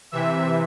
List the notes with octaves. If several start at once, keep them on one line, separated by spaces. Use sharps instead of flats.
C3 E3 E5